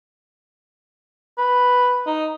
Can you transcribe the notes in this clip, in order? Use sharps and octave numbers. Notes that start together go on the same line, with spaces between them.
B4
D#4